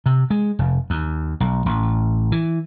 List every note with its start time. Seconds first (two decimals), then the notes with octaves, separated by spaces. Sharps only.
0.06 C3
0.30 G#3
0.59 F1
0.90 D#2
1.40 B1
1.66 A1
2.32 E3